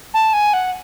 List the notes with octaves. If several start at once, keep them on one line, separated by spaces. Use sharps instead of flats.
A5
G#5
F#5